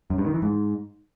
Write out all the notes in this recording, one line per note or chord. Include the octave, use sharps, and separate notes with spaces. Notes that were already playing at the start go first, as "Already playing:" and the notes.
F#2
G2
D#3
E3
G#2